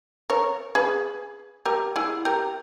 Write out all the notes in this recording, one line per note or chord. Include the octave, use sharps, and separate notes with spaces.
A#4 C#5
G#4 B4
G4 A#4
E4 G#4
G4 A#4